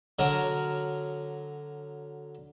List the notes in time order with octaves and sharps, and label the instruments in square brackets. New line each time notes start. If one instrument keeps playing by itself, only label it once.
[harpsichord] D3 F#3 A#4